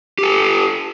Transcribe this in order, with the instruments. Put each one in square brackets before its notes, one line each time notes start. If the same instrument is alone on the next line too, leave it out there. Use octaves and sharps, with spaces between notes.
[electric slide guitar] G4 A4